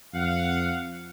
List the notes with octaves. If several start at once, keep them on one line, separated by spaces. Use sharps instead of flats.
F2 F5 F#5